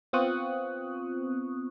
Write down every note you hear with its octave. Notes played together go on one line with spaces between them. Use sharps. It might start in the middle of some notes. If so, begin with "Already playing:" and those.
B3 C4 F4 C#6 D#6 F#6